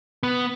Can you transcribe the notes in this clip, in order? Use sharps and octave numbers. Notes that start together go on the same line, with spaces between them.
B3